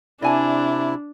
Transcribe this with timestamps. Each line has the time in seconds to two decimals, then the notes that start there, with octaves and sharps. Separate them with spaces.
0.22 C3 D4 E4 D5 G#5 A5